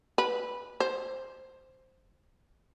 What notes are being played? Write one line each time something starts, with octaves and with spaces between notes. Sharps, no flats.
B4
C5